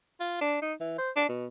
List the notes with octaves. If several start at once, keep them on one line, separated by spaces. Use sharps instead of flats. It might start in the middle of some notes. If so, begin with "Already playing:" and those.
F4
D4
D#4
E3
C5
D4
B2